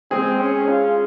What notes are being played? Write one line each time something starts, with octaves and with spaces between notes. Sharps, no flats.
G#3 C4 G#4
C#4
F4